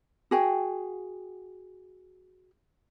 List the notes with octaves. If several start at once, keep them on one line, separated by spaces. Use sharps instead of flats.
F#4 G#4 G5